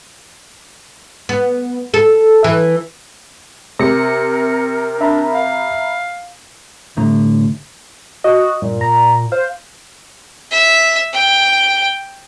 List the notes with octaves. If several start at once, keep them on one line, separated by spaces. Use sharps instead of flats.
B3
A4
E3
C3 A#4 A#6 C#7
D4 E5 A#5 B5
F5
C2 A2 D3 A#5
F#4 D#5
G2 A#2
A#5
C5 F5
E5
G5